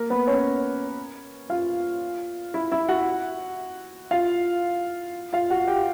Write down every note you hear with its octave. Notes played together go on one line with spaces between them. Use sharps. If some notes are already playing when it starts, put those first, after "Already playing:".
Already playing: A#3 A#4
B3 B4
C#4 C#5
F4 F5
E4 E5
E4 E5
F#4 F#5
F4 F5
F4 F5
F#4 F#5
G4 G5